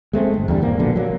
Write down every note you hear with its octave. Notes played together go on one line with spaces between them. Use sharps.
G#3 A3 C4
G1
E2 D3 G3
G#1 A#2 F3 A#3
A#1 B2 D3
F#3 A#3